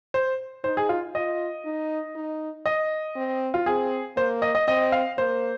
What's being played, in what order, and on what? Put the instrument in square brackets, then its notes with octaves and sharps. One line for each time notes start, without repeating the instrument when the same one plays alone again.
[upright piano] C5
[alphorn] D#4 [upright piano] C5
[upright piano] G#4
F4
[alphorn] F4 [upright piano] D#5
[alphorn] D#4
D#4
[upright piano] D#5
[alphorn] C4
[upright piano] F4
[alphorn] C4 [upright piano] G#4
[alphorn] A#3 [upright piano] C5
[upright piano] D#5
D#5
[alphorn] C4 [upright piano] D#5
[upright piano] F5
[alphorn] A#3 [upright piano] C5